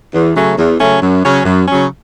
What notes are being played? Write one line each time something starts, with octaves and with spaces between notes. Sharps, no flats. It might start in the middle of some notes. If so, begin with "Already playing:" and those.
E2
C#3 F#3 A3 C#4
E2
C#3 F#3 A3 C#4
F#2
C#3 F#3 C#4
F#2
C#3 F#3 C#4